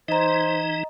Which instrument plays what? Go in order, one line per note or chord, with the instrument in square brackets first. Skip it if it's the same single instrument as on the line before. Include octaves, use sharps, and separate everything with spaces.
[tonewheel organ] E3 D#4 [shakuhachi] C5 [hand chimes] D#5 A#5